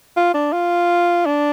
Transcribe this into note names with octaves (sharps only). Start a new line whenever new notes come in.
F4
D4
F4
D4